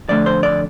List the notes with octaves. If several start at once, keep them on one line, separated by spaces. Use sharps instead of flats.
F2 D3 A3 D5
C5
D5